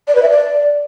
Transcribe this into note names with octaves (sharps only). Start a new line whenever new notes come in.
D5
B4
E5
D5